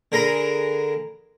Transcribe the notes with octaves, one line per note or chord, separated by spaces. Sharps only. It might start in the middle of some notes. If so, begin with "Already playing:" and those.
D3 G#4 A#4 A#5 B5